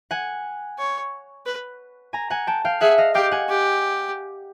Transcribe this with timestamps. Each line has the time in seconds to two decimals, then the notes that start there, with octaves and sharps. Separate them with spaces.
0.11 F#5 G#5
0.79 C#5
1.46 B4
2.13 G#5 A#5
2.30 F#5 G#5
2.47 G5 A5
2.65 F5 G5
2.81 G#4 E5 F#5
2.98 D#5 F5
3.15 G4 F5 G5
3.31 F#5 G#5
3.49 G4